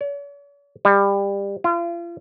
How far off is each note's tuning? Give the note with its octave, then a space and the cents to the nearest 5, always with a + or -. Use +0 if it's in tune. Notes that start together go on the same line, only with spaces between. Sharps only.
C#5 +45
G3 +25
F4 -35